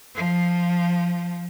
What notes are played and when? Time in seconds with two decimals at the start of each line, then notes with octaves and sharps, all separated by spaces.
0.15 F3